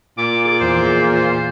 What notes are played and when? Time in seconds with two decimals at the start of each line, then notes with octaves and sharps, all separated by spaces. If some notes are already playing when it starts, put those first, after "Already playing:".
0.18 A#2 D6
0.45 G#4 D6
0.61 E2 C5
1.15 C5